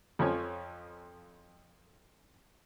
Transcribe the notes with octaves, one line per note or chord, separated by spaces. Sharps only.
F2 F3 C#5 G#5